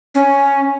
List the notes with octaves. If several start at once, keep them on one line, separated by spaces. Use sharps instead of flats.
C#4